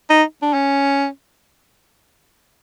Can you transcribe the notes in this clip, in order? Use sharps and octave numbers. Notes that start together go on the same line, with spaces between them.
D#4
D4
C#4